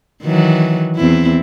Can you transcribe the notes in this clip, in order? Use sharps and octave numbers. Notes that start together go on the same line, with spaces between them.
D#3 E3 F#3
E2 C4 E4